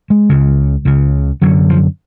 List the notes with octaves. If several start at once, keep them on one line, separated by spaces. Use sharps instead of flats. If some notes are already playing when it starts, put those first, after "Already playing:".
G#3
C#2 C#3
C#2 C#3
F#2 D3 F#3
F3